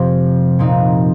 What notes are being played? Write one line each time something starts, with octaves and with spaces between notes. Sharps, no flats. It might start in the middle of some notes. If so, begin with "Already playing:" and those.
Already playing: F1 F2 C3 F3
A#2 F3 C4 D#4